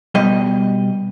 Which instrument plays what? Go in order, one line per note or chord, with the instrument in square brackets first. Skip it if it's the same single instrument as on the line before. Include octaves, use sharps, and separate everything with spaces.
[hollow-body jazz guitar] B2 G3 D#5